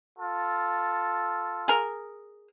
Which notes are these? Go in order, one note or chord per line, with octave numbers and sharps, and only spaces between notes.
F4 A4
G#4 A#4